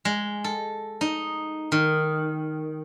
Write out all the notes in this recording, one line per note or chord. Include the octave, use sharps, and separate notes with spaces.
G#3
A4
D#4
D#3